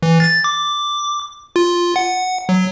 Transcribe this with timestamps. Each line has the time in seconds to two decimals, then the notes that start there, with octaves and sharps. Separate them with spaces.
0.03 E3
0.20 A6
0.44 D6
1.56 F4
1.96 F#5
2.49 F#3